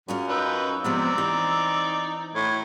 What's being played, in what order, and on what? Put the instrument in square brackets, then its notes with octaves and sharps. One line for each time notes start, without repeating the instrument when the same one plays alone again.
[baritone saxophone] F#2 [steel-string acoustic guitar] C#4 F4 G#4
[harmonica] D#4 B4 G5 [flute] E6
[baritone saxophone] C3 [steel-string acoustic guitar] F3 G#3 B3 [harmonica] C4 D5 A#5
[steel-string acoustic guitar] E3 [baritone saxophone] D#4
[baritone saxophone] A2 [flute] G#6